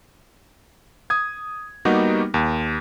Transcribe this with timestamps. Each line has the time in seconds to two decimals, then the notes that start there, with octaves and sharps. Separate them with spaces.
1.10 D#6 G#6
1.85 G3 A#3 B3 D#4 F#4 G4
2.34 D#2